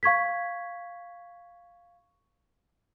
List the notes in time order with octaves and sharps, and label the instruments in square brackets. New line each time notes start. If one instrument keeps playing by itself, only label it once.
[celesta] F5 C#6 G#6 B6